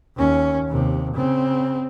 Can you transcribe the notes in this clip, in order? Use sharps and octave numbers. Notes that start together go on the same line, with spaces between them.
D#2 C#4
D#2 C3
C#3 C4